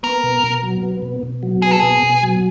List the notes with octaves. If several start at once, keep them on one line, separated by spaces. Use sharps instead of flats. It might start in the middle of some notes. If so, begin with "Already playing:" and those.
B3 A#4
B2
B2
F#3
B3
B2
B2
F#3
B3 G#4
A4
B2 G#4
B2
F#3